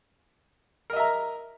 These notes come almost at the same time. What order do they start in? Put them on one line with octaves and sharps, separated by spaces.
A#4 D#5 E5 A#5